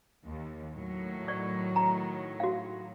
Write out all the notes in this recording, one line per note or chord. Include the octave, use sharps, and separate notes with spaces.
D#2
A2 D#3 F#3
D5 C#6
A#5
F#4 F5